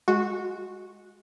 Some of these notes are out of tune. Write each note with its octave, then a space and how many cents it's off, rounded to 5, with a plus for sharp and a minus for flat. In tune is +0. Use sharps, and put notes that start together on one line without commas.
G#3 +0 F#4 -10